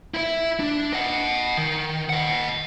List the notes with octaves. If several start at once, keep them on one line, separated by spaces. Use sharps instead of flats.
E4 E5
D4
D#5 F#5
D#3
D#5 F#5